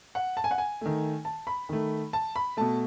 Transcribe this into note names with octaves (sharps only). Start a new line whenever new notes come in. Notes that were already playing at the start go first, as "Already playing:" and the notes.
F#5
A5
G#5
F#5
G#5
D#3 A3
A5
B5
D#3 A3
A5
B5
B2 A3 A5